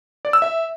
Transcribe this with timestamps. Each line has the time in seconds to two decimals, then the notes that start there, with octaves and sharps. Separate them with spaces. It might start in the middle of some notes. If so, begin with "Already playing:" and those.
0.25 D5
0.33 E6
0.42 E5